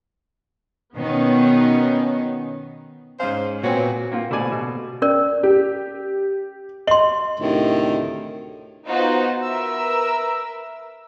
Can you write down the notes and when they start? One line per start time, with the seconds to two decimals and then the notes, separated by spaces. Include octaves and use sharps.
0.96 B2 D#3 B3 C#4 D#4
3.20 G#2 C#4 C5 F5
3.63 A#2 B3 C4 F#4 C#5 G#5
4.12 A#3 C4 F4
4.31 B2 A3 C5 D5 G#5
4.52 B2
5.02 C#4 A#4 D5
5.43 G4
6.87 D#5 C6 F#7
7.40 D2 A2 C3 D#3
8.87 B3 D#4 F4 F#4 C5
9.44 A#4 B4 E5 E6